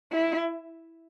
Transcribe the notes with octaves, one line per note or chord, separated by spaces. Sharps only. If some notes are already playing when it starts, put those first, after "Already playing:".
E4